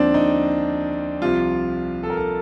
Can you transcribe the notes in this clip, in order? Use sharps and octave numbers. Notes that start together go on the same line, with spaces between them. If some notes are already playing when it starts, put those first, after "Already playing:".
Already playing: D#2 D3 F3 C4 D4
D#4
C2 C3 F3 F4
A4
A#4
A4